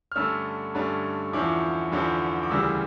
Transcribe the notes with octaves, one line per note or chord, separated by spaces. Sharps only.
F6
G2 D3 A3 C#4 E6
G2 D3 A3 C#4
E2 D3 F3 C#4 E4 D6
E2 D3 F3 C#4 E4
D6
D2 C#3 E3 G3 E6